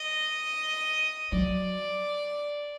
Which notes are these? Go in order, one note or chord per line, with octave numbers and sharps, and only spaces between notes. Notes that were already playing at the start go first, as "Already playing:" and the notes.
Already playing: D#5
F#3 D5